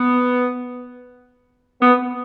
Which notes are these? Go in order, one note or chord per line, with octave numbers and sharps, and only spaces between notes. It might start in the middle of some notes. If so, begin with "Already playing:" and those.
Already playing: B3
B3